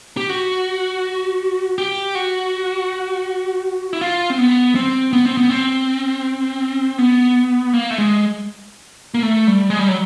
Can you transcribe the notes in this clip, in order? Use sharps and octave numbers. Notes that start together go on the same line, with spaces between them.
G4
F#4
G4
F#4
E4
F4
C4
B3
C4
B3
C4
B3
C4
B3
A#3
A3
G#3
A#3
A3
G3
G#3
G3
F#3